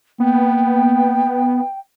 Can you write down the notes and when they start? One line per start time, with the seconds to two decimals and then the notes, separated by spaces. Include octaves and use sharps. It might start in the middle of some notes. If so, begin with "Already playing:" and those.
0.20 A#3 B3 G5